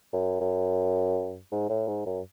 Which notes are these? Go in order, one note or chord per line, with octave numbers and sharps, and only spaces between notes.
F#2
F#2
G#2
A2
G#2
F#2